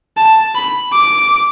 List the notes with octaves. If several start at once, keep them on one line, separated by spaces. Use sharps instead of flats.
A5
B5
D6